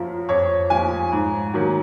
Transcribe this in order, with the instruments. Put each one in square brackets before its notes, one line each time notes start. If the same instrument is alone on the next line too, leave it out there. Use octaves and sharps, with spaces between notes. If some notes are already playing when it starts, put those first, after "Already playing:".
Already playing: [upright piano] F#2 F3
F2 C#5
F3 G#5
G#2
D#3 F#3